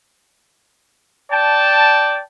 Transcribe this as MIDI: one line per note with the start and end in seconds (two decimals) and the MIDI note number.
1.31 2.21 74
1.31 2.21 79
1.31 2.21 81